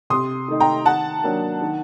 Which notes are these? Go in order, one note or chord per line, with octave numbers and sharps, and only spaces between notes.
C3 C6 D#6
D#3 A3 D#4
G5 A#5
D#3 F#5 A5
F#3 A#3 D4
D#3